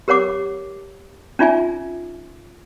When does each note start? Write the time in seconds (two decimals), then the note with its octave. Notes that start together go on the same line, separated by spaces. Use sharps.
0.08 G4 A#4 C#5 F#5 D6
1.39 C#4 D#4 F4 E5 G#5